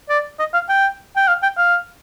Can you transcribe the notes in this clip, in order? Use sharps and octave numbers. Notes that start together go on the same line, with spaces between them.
D5
D#5
F5
G5
G5
F5
G5
F5